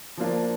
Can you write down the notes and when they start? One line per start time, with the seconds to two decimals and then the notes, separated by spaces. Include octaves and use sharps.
0.17 F3 A#3 D4 F4